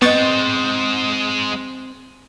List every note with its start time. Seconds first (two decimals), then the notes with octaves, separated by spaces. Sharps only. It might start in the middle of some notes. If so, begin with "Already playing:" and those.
0.02 G#3 B3 C4 C5 D#5 C#6 A6